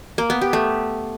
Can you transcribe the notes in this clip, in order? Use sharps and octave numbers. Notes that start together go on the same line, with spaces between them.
A#3
B3
G4
A3